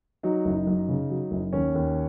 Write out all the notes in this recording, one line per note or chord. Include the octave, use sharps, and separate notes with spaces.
F#3 D#4
F#1
F#2
C#3
F#3
F#1
D#2 C#4
D#2